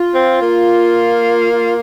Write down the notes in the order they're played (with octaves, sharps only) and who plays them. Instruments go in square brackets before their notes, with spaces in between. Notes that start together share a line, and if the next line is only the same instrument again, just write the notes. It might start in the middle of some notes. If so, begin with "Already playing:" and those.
Already playing: [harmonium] F4
[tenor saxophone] C4
A#3
[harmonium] F4